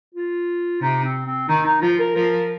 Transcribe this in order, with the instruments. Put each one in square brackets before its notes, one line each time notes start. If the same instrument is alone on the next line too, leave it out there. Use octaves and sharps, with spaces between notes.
[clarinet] F4
[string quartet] C3 [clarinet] D#4
[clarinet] C4
C4
[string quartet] D#3 [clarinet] D#4
[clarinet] D#4
[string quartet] F3 [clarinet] F4
[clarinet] A#4
[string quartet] F3 [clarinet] A#4